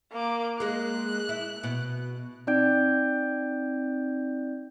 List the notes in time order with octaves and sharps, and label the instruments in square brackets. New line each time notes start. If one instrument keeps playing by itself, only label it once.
[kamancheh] A#3 D6
[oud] G#3 A#3 [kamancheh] F#6
[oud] E4
B2
[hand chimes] C4 D#4 D5 G5 G6 D7